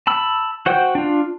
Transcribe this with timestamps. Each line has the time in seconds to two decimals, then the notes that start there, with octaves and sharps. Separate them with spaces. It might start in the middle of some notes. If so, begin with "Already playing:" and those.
0.07 A5 B5 E6
0.66 F#4 C5 F#5 G5 G6
0.95 D4 F4